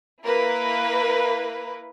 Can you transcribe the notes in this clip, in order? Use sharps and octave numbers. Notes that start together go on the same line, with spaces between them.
A#3 E4 A#4 B4